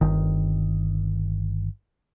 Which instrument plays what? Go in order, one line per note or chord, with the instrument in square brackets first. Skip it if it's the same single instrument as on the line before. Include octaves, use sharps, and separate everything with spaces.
[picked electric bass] G1 D#3